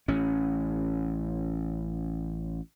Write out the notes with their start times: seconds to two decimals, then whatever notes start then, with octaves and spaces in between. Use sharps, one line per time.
0.08 A1 C#4